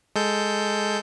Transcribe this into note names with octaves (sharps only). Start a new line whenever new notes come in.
G#3 A4 G6